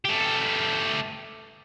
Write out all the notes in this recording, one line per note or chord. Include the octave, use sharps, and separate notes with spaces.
A3 G4